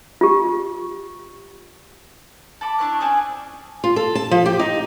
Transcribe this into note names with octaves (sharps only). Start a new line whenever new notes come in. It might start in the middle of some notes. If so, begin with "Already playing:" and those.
F4 G4
A4 B5 D6
D4 E4 C#5 F#6
C4 C#4 G#4 D5
F4
A4
A5
F3
G4
D#4